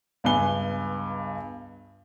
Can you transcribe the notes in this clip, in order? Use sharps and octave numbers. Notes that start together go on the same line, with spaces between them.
C#2 G2 B3 G#5 G7